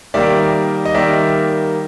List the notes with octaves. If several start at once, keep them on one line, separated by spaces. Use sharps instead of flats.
D#3 G3 A#3 D5 E5
D#5
D#3 G3 A#3 D5 E5